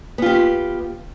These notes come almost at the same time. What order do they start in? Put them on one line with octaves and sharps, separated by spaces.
B3 F4 G4